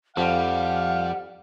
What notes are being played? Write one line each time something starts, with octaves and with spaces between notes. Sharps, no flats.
F2 G3 F5 F#5